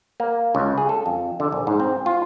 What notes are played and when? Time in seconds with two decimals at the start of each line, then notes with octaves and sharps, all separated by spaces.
0.20 A#3
0.55 C#2
0.78 G#4
0.89 A4
1.06 F2
1.40 D3
1.52 A#1
1.67 G#2
1.80 C4
2.06 F4